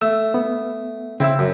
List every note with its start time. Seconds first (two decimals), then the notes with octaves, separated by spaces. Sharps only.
0.01 A3 E6
0.34 B3
1.20 C#3 C4 E4 E6
1.39 F#2